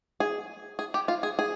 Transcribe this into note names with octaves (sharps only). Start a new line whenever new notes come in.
G#4
G#4
G4
F4
G#4
G#4